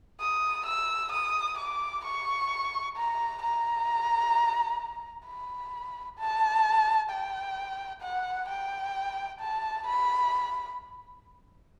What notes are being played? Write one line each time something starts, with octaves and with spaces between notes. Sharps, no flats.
D#6
E6
D#6
D6
C#6
A#5
A#5
B5
A5
G5
F#5
G5
A5
B5